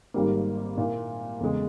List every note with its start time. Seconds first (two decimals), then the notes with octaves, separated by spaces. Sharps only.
0.14 G#1 G#2 G3 A#3
0.77 A#2 A#3 E4
1.40 E2 C#3 G#3